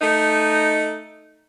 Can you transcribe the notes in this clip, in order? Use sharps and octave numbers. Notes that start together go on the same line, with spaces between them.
A3 D#4